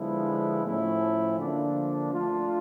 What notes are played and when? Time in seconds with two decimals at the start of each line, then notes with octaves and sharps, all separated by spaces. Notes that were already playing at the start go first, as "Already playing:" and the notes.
Already playing: D3 F3 G#3 B3 E4
0.63 A2 F3 A3 C#4 E4
1.38 D3 F3 A#3 D4
2.11 A3 D4 F4